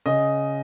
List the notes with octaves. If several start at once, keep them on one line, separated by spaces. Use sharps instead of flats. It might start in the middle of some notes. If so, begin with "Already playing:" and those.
C#3 D#5